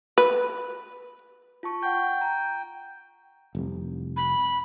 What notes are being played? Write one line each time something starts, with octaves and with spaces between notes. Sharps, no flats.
B4
F4 A5 C#6
F#5 G5 G6
A#5
F1 C2
B5